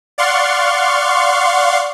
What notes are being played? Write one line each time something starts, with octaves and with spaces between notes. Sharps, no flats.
D5 F5 F#5 C6 C#6